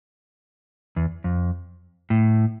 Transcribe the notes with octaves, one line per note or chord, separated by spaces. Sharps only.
E2
F2
A2